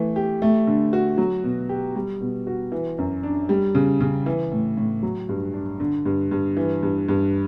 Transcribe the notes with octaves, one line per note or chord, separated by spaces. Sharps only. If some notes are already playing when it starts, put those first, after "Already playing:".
Already playing: E3 A3
G4
A3
D3
F#4
F#3
B2
G4
G3
B2
F#4
E3
F#2
D4
G3
C#3
C#3
E3
A2
A2
F#3
G2
D4
D3
G2
G2
E3
G2
G2